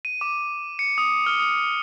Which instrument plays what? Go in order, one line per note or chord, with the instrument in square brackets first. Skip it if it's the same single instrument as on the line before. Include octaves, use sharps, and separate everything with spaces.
[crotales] D#7
D6
C#7
D#6
F6
D#6